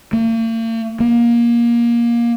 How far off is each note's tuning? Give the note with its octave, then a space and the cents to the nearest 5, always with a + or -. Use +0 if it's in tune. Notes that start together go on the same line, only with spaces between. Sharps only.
A#3 -45
A#3 +20